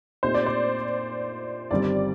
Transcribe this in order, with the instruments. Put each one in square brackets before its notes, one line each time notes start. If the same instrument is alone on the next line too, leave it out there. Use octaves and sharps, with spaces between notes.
[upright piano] A#2 A3 C4 D#4 G4 [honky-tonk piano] C5
[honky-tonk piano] D5
C5
[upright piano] G1 G2 D#3 G3 C4 [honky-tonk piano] D5